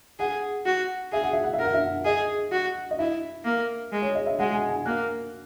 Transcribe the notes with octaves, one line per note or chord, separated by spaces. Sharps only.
G#4 F#5
F#4
G#4 E5
F#5
E5
F#5
E5
A#4
F#5
E5
G#4 D#5
F#4
D#5
E4 E5
A#3
G#3
C#5
D#5
E5
G#3 F#5
G#5
G#5
A#3 F#6